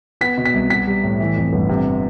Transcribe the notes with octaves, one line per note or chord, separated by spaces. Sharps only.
B3 B6
B2
B6
C2
B3 B6
G3
A2
E3
F2
G1
C3